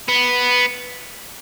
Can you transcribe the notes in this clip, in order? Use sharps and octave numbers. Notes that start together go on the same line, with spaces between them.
B3